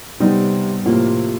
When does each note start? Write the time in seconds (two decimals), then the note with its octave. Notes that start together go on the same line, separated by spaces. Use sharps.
0.20 C3 G3 B3 D#4
0.84 A2 C3 F3 A#3